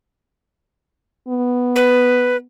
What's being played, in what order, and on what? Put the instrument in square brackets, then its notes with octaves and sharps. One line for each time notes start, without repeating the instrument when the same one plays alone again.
[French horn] B3
[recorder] B4